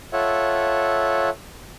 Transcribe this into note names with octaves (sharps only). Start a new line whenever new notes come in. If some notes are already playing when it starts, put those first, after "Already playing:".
F4 A4 C#5 E5 F#5